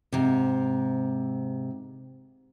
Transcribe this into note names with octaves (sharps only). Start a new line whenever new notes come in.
G#2 C3